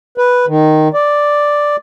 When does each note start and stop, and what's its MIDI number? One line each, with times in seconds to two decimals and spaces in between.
0.18 0.46 71
0.47 0.88 51
0.94 1.76 74